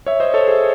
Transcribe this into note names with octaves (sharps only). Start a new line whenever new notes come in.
C#5 E5
C5 D#5
A4 C#5
G#4 C5